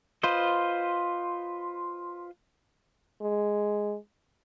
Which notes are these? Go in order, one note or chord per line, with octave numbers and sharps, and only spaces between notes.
F4 B4 C5 D#5
G#3